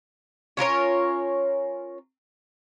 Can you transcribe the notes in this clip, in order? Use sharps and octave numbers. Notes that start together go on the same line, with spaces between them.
C#4 F4 A#4 C#5